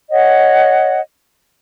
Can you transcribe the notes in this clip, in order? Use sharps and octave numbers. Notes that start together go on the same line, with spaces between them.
C#5 D#5 F#5